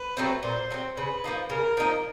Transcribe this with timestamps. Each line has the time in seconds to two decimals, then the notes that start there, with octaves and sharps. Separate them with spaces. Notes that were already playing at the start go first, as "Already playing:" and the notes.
Already playing: B4
0.17 F#3 A3 C4
0.43 A#2 C5
0.70 F#3 A3 C4
0.97 C#3 B4
1.24 F3 A#3 D#4
1.50 C#3 A#4
1.77 F3 A#3 D#4